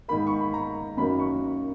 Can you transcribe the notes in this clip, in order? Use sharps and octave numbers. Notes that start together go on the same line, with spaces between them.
G#2 D#3 A#3 B5
C#6
B5
A#5
F#2 D#3 F#3 A#3 B5
C#6